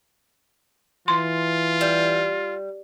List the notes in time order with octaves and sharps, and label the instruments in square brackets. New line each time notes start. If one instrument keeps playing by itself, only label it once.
[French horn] E3 [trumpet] F4 [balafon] C6
[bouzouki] G3